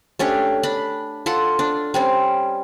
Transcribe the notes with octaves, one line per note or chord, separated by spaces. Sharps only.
A3 C#4 D4 G4
D4 B5
F4 A4 F#5
D4
G3 C4 C#4